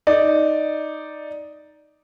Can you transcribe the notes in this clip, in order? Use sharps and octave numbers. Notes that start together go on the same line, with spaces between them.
D#4 D5